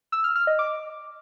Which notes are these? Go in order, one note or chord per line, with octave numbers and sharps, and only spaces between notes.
E6
F6
F6
D#5
D6